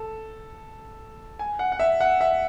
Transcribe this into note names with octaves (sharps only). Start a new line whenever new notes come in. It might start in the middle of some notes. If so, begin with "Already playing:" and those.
Already playing: A4
G#5
F#5
F#5
E5
F#5
E5